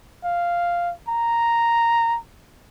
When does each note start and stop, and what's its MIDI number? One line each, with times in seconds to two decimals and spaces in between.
0.24 0.91 77
1.08 2.17 82